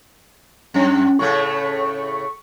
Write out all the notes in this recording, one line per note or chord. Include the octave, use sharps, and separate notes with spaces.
F#2 C#4
A2 C#3 A3 C#6